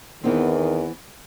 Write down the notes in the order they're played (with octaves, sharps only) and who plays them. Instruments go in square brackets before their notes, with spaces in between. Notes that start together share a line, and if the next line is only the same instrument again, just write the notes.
[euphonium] E2 [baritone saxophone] D#3 [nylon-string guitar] E3 B3 C4